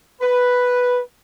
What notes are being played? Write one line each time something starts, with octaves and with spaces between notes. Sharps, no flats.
B4